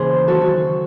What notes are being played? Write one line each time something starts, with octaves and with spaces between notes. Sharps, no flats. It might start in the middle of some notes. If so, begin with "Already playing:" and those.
Already playing: D#2 C#3 E3 G#4 C5
F#2 D#3 F#3 F#4 A4
F#4